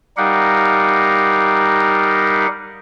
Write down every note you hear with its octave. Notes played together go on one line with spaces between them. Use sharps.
G3 D#4 G4 A#4 F5 F#5